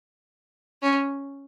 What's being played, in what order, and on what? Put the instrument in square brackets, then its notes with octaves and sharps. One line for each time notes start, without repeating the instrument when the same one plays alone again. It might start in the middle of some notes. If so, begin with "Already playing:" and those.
[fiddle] C#4